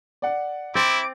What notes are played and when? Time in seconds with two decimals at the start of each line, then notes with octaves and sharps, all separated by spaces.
0.22 D5 F#5
0.75 C4 E4 D6 A6